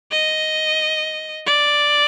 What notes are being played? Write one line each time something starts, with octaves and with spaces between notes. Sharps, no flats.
D#5
D5